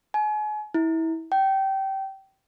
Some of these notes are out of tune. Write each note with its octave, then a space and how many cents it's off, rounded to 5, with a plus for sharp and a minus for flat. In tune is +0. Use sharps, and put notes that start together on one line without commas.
G#5 +35
E4 -25
G5 -20